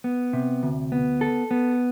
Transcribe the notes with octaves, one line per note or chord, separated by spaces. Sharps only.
B3
C3
D2
B3
A4
B3